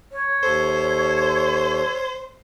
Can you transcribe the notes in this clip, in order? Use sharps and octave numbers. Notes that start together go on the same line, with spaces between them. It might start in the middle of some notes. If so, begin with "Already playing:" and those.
C#5
D#2 A4 C5